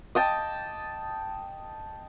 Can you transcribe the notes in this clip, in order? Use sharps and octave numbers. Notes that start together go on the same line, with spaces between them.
D#5 G5 A5